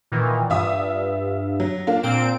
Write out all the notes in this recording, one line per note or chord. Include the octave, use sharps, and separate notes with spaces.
A#2 D#3 E3
G2 F4 E5 D#6
F#3
A#3 D4 F4
A#2 C4 D7